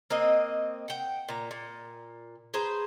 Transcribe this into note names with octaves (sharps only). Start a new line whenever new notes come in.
A#3 C4 D#5
F#5 G5
A#2 A#5
A#2
G#4 B4 C5 A#5